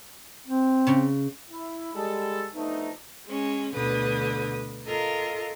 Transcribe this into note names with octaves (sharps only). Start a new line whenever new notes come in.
C4
C#3
E4
G3 G#3 A4
F3 A3 B3 D4 D#4
G#3 C#4
D2 B2 D3 B4 D#6
F4 A4 A#4 D#5